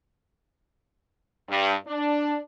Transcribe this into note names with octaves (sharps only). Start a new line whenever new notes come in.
G2
D4